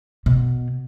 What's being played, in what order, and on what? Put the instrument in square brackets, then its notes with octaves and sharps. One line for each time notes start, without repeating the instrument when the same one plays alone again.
[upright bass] B2